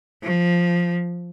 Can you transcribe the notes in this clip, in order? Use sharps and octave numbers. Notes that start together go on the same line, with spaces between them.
F3